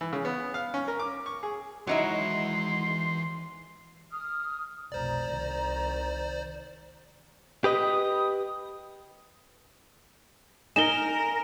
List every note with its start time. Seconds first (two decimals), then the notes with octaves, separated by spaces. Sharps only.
0.01 E3
0.13 C#3
0.25 B3
0.54 F5
0.74 C#4
0.88 A#4
1.00 D6
1.26 C#6
1.43 G#4
1.87 D#3 E3 F#3 G#3 D#4 E4 F#5 C6
4.11 D#6 F6
4.92 F1 B1 C5 D5 A#5
5.29 C2 D#3
7.64 G4 B4 D#5 D#6
10.76 D#4 A#4 G#5 E7 G7